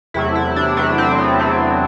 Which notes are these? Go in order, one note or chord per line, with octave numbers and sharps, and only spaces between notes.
E2 C3 F#3 A3 E4
E4
D4
E2 C3 F#3 A3 D4
C4
B3
E2 C3 F#3 A3 C4